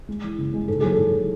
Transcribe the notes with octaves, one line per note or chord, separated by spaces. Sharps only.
G#3
E3
C#3
G#3
G#2 A4
F#3 G#4
A4
G#2